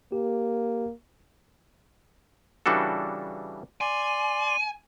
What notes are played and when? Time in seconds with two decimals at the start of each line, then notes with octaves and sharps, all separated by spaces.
0.12 A#3 G4
2.66 C#3 E3 G3 D4 F#4 A4
3.81 D5 G#5 C6